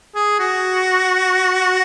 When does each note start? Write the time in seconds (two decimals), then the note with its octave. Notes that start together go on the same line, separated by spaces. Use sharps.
0.15 G#4
0.39 F#4